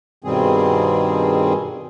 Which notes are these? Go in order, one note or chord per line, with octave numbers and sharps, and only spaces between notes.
G2 B2 D#3 G3 C4 G#4